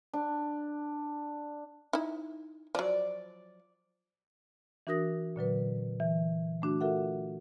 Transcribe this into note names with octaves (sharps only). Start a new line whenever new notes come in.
D4
D#4 E4
F3 F#3 D5
E3 D4 F#4 A#4 D#6 A#6
A#2 D3 F#3 B4
E3
A3 D4 F#4
F4 F#4 A4 A#4 E5 F#5